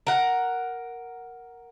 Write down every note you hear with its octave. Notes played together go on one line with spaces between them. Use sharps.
A#4 F#5